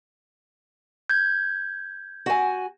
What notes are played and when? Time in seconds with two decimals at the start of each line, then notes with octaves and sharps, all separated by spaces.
1.10 G6 G#6
2.26 F#4 G#5